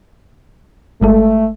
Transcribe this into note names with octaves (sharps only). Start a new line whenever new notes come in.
G1 G#3 A3 A4